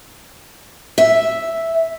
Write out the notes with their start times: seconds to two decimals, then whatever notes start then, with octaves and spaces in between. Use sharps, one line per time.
0.98 E5